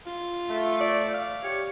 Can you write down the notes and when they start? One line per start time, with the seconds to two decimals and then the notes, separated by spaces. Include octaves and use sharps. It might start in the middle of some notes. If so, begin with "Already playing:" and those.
0.06 F4
0.48 A3
0.80 D5
1.14 F5
1.42 G4 C#5